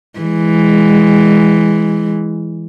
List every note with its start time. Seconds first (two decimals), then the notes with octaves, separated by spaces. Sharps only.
0.20 E3 G#3